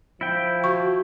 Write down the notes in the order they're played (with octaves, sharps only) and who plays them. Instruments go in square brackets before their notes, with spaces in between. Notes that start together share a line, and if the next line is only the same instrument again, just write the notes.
[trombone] F3 [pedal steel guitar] E4 G5
[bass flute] F#4 [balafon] C#6